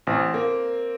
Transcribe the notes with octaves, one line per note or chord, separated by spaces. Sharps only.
A1 C4
A#3